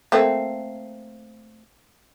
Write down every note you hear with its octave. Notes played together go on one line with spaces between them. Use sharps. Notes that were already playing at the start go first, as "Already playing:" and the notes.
A3 A#3 C4